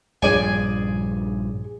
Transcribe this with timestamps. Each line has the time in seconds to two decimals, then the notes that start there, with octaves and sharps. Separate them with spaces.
0.22 A#1 G2 F3 G#4 D5 G#5